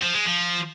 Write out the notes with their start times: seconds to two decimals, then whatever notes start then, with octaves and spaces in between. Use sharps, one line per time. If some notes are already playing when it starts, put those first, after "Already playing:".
0.03 F3
0.14 G#3
0.26 F3